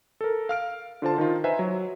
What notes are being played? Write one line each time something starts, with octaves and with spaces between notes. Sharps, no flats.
A4 A#4
F5 F6 D7
D3 F4 C5 A5
D#3 D#4 F4
B4 C5 D#5 E5 G#5 A#5
F#3